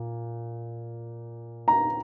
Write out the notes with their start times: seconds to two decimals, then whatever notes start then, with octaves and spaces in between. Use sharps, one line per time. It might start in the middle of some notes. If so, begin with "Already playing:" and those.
Already playing: A#2
1.68 A#5